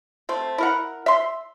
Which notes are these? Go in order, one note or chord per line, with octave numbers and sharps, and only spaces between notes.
A3 C4
E4 A#4 F#5
E5 C6